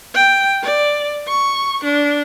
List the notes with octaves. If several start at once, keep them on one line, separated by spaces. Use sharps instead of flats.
G5
D5
C#6
D4